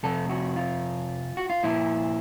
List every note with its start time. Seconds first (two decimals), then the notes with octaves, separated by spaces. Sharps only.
0.03 F2 C3 F3 A4
0.29 F#4
0.56 F4
1.37 F#4
1.50 F4
1.64 A#2 F3 E4